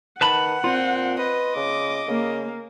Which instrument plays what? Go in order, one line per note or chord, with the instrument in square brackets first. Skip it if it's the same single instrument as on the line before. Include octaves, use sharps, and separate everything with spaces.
[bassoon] D#3 [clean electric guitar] B4 A5 B5 [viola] F#5
[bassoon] A#2 [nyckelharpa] C4 [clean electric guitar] F4
[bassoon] B4 [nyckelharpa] D#5
[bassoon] C#3 [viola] D6
[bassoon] C#3 [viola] A#3